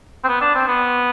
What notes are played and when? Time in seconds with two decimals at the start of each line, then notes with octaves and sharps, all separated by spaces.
0.24 C4
0.29 B3
0.41 D4
0.55 C4
0.68 B3